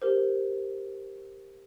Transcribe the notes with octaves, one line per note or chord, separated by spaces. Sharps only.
G4 A#4 C5